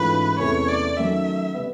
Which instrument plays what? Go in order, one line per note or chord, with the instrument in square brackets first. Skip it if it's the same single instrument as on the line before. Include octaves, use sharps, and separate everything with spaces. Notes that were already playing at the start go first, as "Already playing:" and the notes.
Already playing: [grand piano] G#2 E3 A3 C#4 F4 [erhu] B4
[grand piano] E2 C3 E3 A3 C#4 [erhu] C#5
[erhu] D5
[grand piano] D#3 F#3 A3 C#4 [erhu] E5
[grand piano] B2 G3 B3